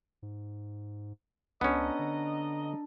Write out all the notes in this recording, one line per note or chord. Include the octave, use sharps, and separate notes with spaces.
G#2
C#2 B3 C#4 D4 A4 D#5 A#5
D3